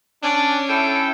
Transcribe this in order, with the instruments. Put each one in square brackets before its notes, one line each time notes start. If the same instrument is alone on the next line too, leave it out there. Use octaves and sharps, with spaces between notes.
[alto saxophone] C#4 [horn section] D4
[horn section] E4 A4 G5